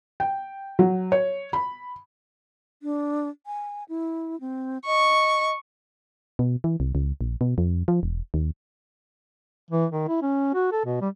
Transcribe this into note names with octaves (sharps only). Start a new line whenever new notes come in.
G5
F#3
C#5
B5
D4
G#5
E4
C4
D#5 C#6
B2
E3
C2
C#2
A#1
B2
F2
F3
E1
D#2
E3
D#3
E4
C#4
F#4
A4
B2
G3